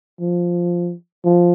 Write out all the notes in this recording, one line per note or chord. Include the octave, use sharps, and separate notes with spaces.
F3
F3